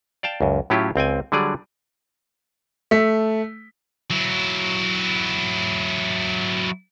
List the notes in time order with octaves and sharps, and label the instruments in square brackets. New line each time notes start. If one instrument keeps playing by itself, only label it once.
[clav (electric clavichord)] D5 F5 G5 A5
C#2 F#2
A2 F#3 C#4 E4 F4 G4
C#2 C4 G5 G#5
D3 F#3 G3 G#4 D5
[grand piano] A3 B6
[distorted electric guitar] F#3 E4